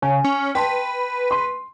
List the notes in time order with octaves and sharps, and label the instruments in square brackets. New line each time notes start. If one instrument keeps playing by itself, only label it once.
[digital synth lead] C#3 [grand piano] G#5
[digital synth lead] C#4
[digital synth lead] B4 [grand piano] G5 A5 C6
[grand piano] C6